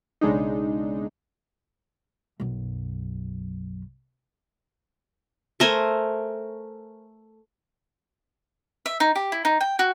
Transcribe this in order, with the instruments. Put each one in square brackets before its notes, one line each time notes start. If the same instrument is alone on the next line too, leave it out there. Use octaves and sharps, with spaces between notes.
[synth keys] B1 C#3 G#3 D4 D#4
[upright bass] B1 F#2
[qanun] A3 A#4 C5 G#5
[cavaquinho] E5
D#4
G4
E4
D#4
G5
F#4